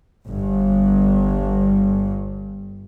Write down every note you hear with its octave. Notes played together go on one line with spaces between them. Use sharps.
G1 G2